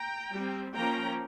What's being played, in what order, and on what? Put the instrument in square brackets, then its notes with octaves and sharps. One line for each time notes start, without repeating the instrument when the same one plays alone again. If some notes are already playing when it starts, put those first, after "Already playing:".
Already playing: [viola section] G5 A#5
G3 C4
F3 A#3 C#4 G5 A#5